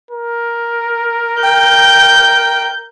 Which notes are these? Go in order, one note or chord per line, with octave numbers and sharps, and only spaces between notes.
A#4
G5 G6